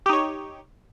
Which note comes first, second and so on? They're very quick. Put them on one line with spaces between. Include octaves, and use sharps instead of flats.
G4 D#4 C#5